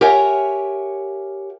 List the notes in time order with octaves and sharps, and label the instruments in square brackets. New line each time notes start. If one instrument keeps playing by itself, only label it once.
[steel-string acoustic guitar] G4 A#4 C#5 E5 F#5 G#5